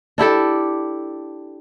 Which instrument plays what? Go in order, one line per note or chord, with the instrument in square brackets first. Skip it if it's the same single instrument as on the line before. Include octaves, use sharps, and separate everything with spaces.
[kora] D4 E4 G4 A4